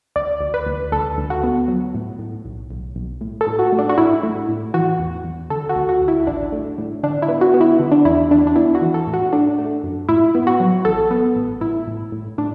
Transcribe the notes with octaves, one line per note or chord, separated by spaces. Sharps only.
D2 D5
D2
B4
D2
D2 A4
D2
F#4
B3
F#3
A2
A2
B1
B1
B1
A2
A4
A2
F#4
A3
D4
F#4
A2 E4
A3
A2
E3 F#4
E2
E2
D3 A4
F#4
D2
F#4
D2
E4
A1 D4
A3
A2
D3 D4
E4
B3
F#4
B3
E4
D3
D4
E2 E4
E2 D4
D4
B3 E4
F#4
E3
A4
A2
F#4
A3 D4
A3
F#2
A2 E4
B3
F#4
F#3
A1 A4
B3
A1
A2 E4
A2
A2
A2 D4